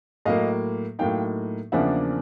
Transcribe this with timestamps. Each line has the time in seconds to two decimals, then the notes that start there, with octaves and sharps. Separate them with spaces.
0.25 A2 F#3 A#3 D#5 F5
0.99 A2 F#3 A#3 D#4 F5 G5
1.72 E2 C#3 F3 A#3 D4 E5 F#5